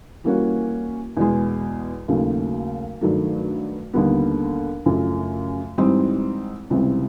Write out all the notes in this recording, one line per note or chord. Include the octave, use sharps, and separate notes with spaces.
E3 G3 A#3 C#4 F#4
E2 B2 G#3
D#2 C#3 F#3 A3
G2 D#3 F#3 A3
D#2 D3 G3 B3
F#2 C#3 F3 A3
G#2 E3 G3 C4 D#4
C#2 C3 E3 G3 C4